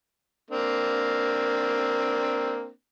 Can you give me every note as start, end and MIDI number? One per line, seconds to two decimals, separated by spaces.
0.51 2.70 58
0.51 2.70 60
0.51 2.70 62